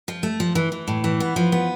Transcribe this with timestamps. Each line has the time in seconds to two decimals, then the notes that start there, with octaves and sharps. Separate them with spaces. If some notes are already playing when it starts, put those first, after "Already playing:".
0.08 F3
0.23 A3
0.40 F3
0.55 E3
0.72 E3
0.88 A2
1.04 E3
1.20 B3
1.36 F3
1.52 B3